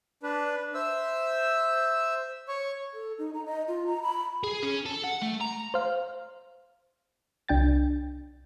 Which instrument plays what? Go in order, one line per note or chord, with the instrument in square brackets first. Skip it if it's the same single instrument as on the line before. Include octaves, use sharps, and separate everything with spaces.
[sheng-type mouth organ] D4 B4
C5 E5 E6
C#5 C#6
[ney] A4
D#4
A#5
D#5
F4
A#5
B5
[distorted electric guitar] G#4
C#4
A4
F#5
A3
A#5
[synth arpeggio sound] C5 F5
C2 D4 G5 A6